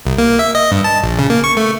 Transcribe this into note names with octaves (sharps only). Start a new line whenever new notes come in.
C2
A#3
E5
D#5
G2
A5
A#1
C#3
A#3
C#6
A3